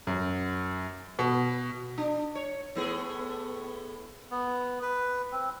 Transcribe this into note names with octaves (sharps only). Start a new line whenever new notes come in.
F#2
B2
D4
C#5
A2 B3 G#4
B3
B4
C4